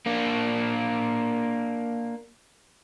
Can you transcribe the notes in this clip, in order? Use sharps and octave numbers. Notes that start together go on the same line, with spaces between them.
A#3 D4